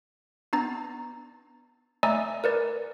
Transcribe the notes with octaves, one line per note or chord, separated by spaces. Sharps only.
B3 D4 A#5 A6
A3 D5 D#5 G#5 A#5 E6
A#4 B4 D5